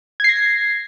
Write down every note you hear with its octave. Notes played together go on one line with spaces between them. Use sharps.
G#6 A#6 C7